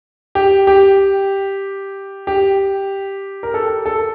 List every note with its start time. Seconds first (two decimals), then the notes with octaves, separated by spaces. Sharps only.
0.35 G4
0.67 G4
2.27 G4
3.43 A#4
3.54 A4
3.86 A4